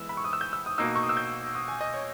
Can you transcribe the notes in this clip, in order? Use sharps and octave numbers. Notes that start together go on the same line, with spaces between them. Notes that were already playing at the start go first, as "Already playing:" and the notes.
Already playing: E3 G#3 B3 E4 E6
B5
C#6
D#6
E6
G6
E6
D#6
B2 A#3 D#4 E6
C#6
D#6
E6
G6
D#6
G#5
D#5
C#5